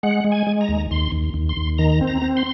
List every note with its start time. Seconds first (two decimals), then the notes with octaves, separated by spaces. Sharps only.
0.03 G#3 F#5
0.24 G#3
0.32 G#5
0.47 G#3
0.61 A#5
0.69 D#2
0.91 D#2 C6
1.12 D#2
1.34 D#2
1.49 C6
1.57 D#2
1.78 D#3 A#5
2.01 C4
2.07 A#5
2.22 C4
2.37 C6